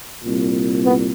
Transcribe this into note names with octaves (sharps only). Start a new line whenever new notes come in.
C2 A#2
B3